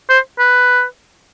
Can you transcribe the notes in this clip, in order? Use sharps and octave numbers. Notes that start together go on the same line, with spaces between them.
C5
B4